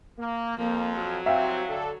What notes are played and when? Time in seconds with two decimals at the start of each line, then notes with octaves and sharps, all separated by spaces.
0.19 A#3
0.57 F2 F3 A#3
0.97 F#3
1.26 C2 C3 C4 E5 F5 G5
1.68 D3 D4 A4